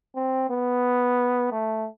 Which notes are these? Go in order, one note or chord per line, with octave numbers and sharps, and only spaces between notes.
C4
B3
A3